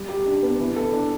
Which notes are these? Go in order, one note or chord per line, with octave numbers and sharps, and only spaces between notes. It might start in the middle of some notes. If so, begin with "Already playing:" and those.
Already playing: G3
G4
D4
B3
E3
A4
D4